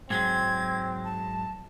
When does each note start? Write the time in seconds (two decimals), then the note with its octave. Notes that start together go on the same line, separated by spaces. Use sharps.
0.10 G#2 F#3 G#3 C4 G#6
1.04 A5